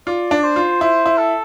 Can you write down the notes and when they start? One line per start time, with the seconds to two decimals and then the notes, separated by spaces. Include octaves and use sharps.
0.07 F4 D5
0.31 D4
0.43 C5
0.56 F4
0.81 E4 C5
1.06 E4
1.18 A4